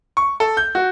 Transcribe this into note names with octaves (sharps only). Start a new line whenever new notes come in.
C#6
A4
G6
F#4